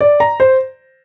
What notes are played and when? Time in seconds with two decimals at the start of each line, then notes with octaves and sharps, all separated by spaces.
0.01 D5
0.20 A#5
0.40 C5